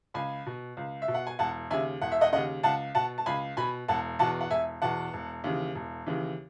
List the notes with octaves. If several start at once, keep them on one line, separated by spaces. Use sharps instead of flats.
C#2 G#5 B5
B2
C#2
E5
B2
F#5
G#5
E1 F#5 A5
D#2 C#3 E5 G#5
E1 F#5
E5
D#5 F#5
D#2 C#3 D#5 F#5
C#2 F#5 A5
B2 F#5 A5
A5
C#2 G#5 B5
B2 G#5 B5
E1 F#5 A5
E2 B2 F#5 A5
F#5
E1 E5 G#5
E2 B2 F#5 A5
E1
D#2 C#3 E3
E1
D#2 C#3 E3